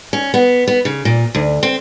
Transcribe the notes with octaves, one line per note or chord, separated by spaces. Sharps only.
C#4
B3
B3
C#3
A#2
D2
C4